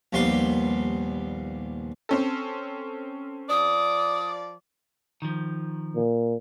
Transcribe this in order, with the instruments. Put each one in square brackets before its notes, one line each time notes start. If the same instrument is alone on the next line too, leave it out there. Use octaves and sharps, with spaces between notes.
[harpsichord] A#1 D#2 G3 B3 C6
[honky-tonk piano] C4 C#4 A4
[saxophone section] F3 D5 [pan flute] D#6
[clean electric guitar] D#3 F3
[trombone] A#2